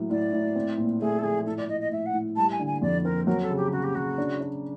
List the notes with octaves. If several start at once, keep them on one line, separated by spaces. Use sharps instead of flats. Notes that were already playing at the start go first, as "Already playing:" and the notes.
Already playing: A2 F#3 A#3
A2 D5
A2
C4
A#2
A3 G#4
A4
F3 G#4
A2 A4
D5
A2 D#5
D#5
A2 E5
F#5
A2
G3 A5
G#5
D3
G#5
F2 D5
C4 A#4
F#3 A#4
A4
C#3
G4
C#3 F#4
G4
C#3 F#4
D4
D4